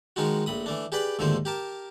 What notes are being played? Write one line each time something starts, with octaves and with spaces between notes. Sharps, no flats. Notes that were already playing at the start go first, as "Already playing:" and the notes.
D#3 F3 G#3 D#4 F4 F#4
A#1 A2 B5 D#6
E3 A3 D4
G4 G#4 B4 D5 G5 B5
D#2 G#2 D3 F3 A3 C5
G4 A#4 A5